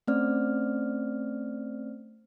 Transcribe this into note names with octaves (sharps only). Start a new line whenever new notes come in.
A3 C4 C#4 C5 D5 F6